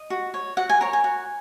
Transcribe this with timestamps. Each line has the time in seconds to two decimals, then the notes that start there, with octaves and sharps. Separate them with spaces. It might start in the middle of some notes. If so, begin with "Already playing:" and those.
Already playing: D#5
0.10 F#4
0.34 C#5
0.57 F#4 F#5
0.70 G#5
0.81 A#4 C#5 A#5
0.93 G#5
1.04 F#4